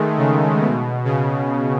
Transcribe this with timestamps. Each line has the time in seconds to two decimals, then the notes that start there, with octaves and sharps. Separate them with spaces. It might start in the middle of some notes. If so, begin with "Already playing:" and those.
Already playing: D#3 G#3 A3
0.18 C#3
0.61 B2
1.05 C#3